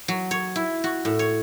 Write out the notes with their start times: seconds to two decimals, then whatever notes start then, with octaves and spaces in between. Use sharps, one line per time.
0.08 F#3
0.31 C#5
0.56 E4
0.84 F#4
1.05 A2
1.19 C#5